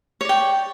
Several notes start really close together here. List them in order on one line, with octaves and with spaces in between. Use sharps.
C#5 D5 G5